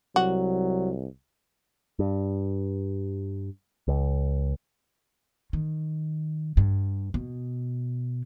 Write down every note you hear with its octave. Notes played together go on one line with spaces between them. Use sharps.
C2 F#3 F#4
G2
C#2
D#3
G2
B2